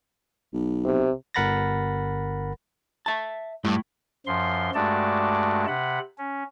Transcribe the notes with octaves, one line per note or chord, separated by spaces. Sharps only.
B1
C3
G1 A#4 F#5 B5 A6 A#6
E5 A5
G2 A3 E4
F#2 F3 C6
G2 G#3 A3 F#4 D5 A5
C3 F#5 B5
C#4